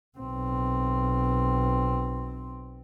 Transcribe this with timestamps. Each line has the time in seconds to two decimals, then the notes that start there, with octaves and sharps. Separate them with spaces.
0.19 B1 C4